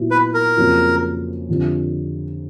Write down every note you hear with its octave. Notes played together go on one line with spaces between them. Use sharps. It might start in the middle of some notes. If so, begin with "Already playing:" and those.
Already playing: A#2 F#3 B3 E4
B4
A#4
F2 C#3 F#3 A#3
F2 D3 G3